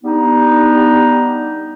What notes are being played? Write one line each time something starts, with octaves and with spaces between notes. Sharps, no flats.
G3 B3 D4 D#4